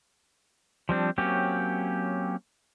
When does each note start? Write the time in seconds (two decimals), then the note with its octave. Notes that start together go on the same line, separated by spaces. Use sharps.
0.89 F3 G3 C4 D4
1.18 F#3 A#3 C4 C#4 G4